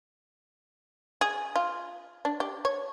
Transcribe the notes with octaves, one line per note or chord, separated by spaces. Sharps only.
G#4
F4
D4
G4
C#5